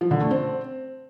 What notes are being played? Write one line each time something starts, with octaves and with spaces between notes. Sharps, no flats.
F3
D3
A3
C4